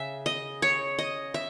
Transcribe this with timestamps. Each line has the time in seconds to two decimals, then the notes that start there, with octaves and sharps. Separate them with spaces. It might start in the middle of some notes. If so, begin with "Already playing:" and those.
Already playing: C#3 E5
0.26 D#5
0.62 C#5
0.99 D#5
1.34 E5